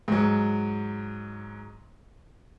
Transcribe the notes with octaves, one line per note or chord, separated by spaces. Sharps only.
G#2 F#3